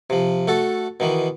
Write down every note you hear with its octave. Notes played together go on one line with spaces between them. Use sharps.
C3 F3
A3 F#4 A4
B2 D#3 E3